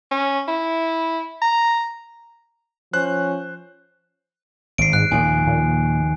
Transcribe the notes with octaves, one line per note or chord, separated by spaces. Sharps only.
C#4
E4
A#5
F3 C#4 C5 F#6
G#1 C7 D7
G#2 F#6
D#2 A#2 F3 G#5
A#2